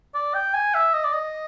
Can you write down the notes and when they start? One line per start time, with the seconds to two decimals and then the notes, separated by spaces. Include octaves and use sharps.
0.14 D5
0.34 G5
0.54 G#5
0.74 E5
0.94 D#5
1.04 D5
1.13 D#5